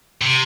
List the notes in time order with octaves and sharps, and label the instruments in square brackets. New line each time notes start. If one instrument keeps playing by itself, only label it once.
[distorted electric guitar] C3